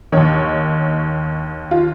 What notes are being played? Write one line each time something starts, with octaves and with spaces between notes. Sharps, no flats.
D#2 D#3 C#5
F4